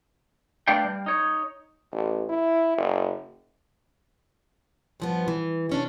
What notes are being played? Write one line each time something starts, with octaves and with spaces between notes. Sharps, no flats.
A3 D4 B4 D5 F5 G5
G3
D#4 C#5
A1
E4
F#1
G2 F3 B3
E3
C3 C#4 D4